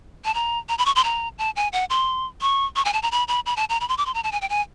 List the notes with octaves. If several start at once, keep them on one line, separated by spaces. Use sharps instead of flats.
A5
A#5
A#5
B5
C#6
C6
A#5
A5
G#5
F#5
C6
C#6
C#6
G#5
A5
A#5
B5
B5
B5
A5
A#5
B5
C6
D6
C6
A#5
A5
G#5
G5
G#5